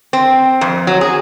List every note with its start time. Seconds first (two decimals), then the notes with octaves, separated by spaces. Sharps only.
0.13 C4
0.61 F2
0.87 F#3
1.01 G#4